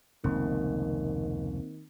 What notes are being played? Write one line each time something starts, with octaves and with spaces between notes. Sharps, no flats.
F1 C#2 D#3 A#3 C4